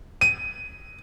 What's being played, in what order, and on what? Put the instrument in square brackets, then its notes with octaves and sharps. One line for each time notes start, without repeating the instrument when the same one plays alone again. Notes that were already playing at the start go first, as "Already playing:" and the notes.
[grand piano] D#7